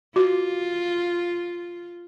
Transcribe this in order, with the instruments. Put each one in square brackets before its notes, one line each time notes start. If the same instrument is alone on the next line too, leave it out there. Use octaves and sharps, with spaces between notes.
[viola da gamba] F4 [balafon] F#4